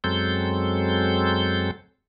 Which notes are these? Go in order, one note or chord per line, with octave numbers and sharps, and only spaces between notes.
F#2 F#3 G#3 C4 A4 G6